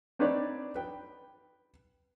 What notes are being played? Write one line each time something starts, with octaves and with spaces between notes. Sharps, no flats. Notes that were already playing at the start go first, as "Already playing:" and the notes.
C4 D4 D#4 B4 C#5 D5
B4 G5